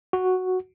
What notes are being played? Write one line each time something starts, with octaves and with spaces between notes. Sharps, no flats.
F#4